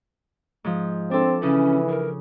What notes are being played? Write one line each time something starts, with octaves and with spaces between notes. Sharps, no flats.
G#2 F3
C4 D4 A4
C#3 E3 C#4
A#4